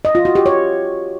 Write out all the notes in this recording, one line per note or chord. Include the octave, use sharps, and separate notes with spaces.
D#5
F4
F#4
G4
C#5